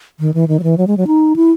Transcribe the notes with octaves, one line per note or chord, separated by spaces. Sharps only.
D#3
E3
D#3
F#3
E3
F#3
G#3
F#3
D#4
E4